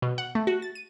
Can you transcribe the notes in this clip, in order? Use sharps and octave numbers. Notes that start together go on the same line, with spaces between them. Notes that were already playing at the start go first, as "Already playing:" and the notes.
B2
F#5
A3
F#4
A6
D#7